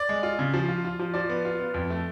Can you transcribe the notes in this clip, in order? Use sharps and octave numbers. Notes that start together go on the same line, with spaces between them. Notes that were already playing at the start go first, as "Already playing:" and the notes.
Already playing: D5
G#3
F4
C#3
F3
F4
F4
F3
F3 D5
B3
F4
B3
F2
A3